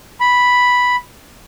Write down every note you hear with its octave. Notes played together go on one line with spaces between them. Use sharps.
B5